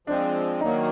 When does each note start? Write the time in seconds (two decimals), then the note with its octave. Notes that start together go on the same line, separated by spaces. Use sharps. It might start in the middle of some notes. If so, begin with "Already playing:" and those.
0.07 F3 G#3 C4 D4
0.61 D#3 F#3 A#3 D#4